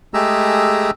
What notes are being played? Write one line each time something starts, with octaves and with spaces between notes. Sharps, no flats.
G#3 A3 G4 G#4 A#5 E6